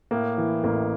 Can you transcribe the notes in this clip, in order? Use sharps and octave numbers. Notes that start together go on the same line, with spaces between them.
A2 A#3
E3
A1 A#3